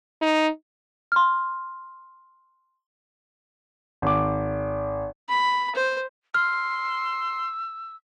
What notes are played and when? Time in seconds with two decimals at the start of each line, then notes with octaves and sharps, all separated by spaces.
0.21 D#4
1.12 C6 F6
4.02 G#1 D6
5.29 B5
5.75 C5
6.34 C6 E6 F6